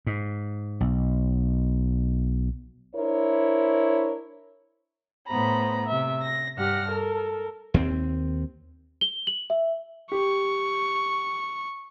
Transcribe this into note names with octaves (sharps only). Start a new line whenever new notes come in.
G#2
B1
D4 E4 A#4 C5 C#5
A2 B3 C5 A#5 B5
C3 E5
A#6
G2 G4 F#5 F6 A#6
A4 A#4
D#2 C4
G7
F#7
E5
G4 C#6